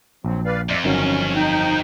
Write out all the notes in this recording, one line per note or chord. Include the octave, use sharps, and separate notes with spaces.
A#1 F#3 C4
B4 D5 F5
F2 D5 E5 D6
G1 D#3 F#3 C#4
D#4 G5